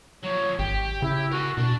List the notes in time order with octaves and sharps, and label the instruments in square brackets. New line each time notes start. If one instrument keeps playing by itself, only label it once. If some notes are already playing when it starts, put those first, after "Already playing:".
[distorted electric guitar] F3 F#3 [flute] C#5
[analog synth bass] G#1 [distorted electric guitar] G4 [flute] G5
[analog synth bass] C#3 [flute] E4
[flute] F#4 [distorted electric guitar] A#4 G#5
[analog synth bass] B2 [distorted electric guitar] D4